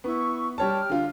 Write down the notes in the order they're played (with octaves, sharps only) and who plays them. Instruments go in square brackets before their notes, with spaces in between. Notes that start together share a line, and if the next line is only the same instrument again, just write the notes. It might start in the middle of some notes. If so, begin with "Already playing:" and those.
[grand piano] B3 [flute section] E4 C#6
[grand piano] G3 C#5 A5 [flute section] G5 F6
[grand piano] D3 F4